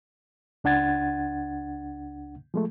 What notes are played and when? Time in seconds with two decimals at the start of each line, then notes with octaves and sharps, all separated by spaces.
0.64 C#2 D4 F#5 G#6 A6
2.54 F3 G#3 A3